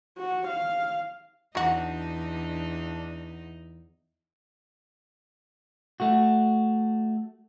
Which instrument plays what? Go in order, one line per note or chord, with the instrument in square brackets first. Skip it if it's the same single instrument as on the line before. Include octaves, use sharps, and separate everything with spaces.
[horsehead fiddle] F#4
F5
[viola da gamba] E2 D#4 [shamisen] F#3 F#4 [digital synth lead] D4
[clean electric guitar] A3 F#4